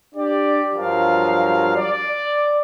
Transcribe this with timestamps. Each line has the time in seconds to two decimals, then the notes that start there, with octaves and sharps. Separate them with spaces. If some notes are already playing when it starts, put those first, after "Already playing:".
0.15 D4 G4 D5
0.75 G2 F3 F#3 A#4 F5
1.75 D5